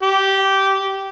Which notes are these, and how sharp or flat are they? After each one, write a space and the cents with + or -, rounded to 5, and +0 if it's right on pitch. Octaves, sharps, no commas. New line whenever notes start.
G4 -15